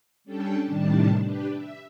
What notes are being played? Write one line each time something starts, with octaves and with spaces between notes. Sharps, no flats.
G3 C#4 D4 A4 G5 A5
A2 C3 D#3 G3 D4 A5
D4 G4 B4
E5